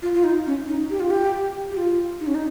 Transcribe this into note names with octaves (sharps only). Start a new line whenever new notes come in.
F4
F4
D#4
C#4
D#4
G4
F4
G4
G4
F4
D#4
C#4
D#4